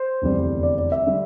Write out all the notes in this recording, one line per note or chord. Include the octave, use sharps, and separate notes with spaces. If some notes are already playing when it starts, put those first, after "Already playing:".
Already playing: C5
F1 E2 D3 G3
D5
D5
E5
D3 G3